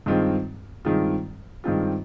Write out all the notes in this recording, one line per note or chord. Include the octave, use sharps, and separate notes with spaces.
G2 D#3 G#3 C4 F4
G2 D#3 G#3 C4 F4
G2 D#3 G#3 C4 F4